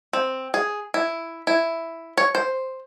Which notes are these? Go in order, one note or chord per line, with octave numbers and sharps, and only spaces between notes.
C4
G#4
E4
E4
C#5
C5